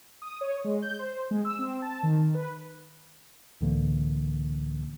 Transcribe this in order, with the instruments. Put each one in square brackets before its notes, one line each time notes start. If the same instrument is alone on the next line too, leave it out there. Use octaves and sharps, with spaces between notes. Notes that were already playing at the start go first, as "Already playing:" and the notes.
[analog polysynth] D#6
C#5
G#3
G6
C5
G#3
E6
C4
A5
D#3
B4
[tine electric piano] C#2 A2 D3 E3 A#3